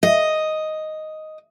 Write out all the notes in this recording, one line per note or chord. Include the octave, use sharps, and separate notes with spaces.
D#5